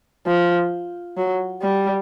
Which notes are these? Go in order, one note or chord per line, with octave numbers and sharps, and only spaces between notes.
F3
F#3
G3